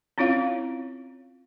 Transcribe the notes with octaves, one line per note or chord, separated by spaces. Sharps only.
C4 C#4 E4 F4 C#5 F5